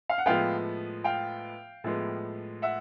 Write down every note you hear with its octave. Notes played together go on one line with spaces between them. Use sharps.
F5
F#5
A2 F3 G#3 B3 F5 G5
F5 G5
A2 F3 G#3 B3
E5 F#5